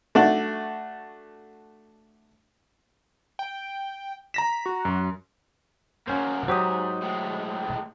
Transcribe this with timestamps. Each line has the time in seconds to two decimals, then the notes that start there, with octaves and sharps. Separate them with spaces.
0.15 A3 D4 F#4
3.39 G5
4.34 A#5 A#6 B6 E7
4.66 F#4
4.85 F#2
6.08 F#3 A#3 C#4 C5
6.48 G#2 F#3 G4 C5 D#6
7.02 A2 G#3